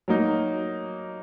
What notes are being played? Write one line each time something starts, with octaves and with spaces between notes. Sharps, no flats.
F#3 A#3 D#4